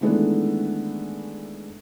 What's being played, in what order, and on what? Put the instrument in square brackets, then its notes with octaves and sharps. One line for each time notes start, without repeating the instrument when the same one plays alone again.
[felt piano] D#3 E3 G#3 A3 B3 D4